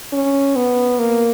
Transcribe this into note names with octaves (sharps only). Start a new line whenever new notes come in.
C#4
B3
A#3